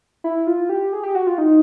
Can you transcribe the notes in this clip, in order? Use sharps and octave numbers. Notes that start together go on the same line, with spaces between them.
E4
F4
G4
G#4
G4
F#4
F4
D#4